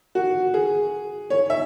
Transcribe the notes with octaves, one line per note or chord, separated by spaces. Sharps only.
F#4
G#4
C#5
E5